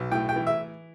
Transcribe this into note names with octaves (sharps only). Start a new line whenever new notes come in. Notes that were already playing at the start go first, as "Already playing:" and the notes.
Already playing: B1
A2 G5
G5
E3
E5